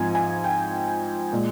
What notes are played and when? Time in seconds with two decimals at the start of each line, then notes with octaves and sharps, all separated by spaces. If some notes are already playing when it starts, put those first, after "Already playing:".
Already playing: G#2 F3 C4 G#5
0.15 G#5
0.44 G5
1.33 A#2 G#3